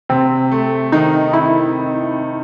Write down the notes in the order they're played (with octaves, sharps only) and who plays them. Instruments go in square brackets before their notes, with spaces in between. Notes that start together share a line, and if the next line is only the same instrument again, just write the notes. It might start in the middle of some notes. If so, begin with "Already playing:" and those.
[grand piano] C3 [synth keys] C4
[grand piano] A3
[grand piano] D#3 [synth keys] D#4
[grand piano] D#3 [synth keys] E4